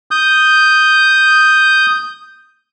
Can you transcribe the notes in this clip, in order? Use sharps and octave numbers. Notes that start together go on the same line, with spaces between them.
D#6 G6